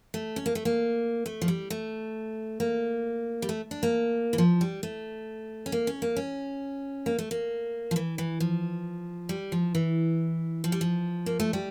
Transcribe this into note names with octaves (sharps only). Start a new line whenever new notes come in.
A3
C#4
A#3
A3
A#3
A3
F3
G3
A3
A#3
G3
A3
D4
A#3
E3
F3
G3
A3
C#4
A#3
C#4
A#3
C#4
A#3
A3
A#3
F3
E3
E3
F3
G3
F3
E3
F3
G3
F3
A#3
A3
G3